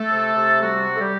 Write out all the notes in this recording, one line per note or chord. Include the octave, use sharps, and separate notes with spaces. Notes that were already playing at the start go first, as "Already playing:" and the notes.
Already playing: A3 A4
C3
C3
G3 F#4
G3
A4
G3 G4